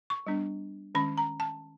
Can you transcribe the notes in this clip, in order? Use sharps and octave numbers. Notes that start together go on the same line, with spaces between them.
C#6
G3 B3 D4
D#3 G#3 C#4 B5
A#5
A5